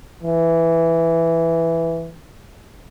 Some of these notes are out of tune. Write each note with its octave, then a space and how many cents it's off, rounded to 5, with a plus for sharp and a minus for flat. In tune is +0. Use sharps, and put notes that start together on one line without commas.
E3 +5